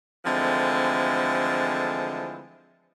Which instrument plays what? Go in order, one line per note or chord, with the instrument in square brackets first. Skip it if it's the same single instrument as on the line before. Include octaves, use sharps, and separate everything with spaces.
[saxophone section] D3 E3 F3 G#3 A3 C4